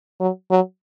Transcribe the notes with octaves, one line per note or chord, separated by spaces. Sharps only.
F#3
F#3